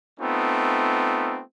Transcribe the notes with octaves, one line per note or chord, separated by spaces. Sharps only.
A3 B3 C4 D#4 F4